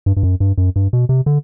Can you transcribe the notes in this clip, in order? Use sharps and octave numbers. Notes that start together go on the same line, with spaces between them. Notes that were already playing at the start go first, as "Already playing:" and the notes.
G2
G2
F#2
G2
F#2
G2
B2
C3
D3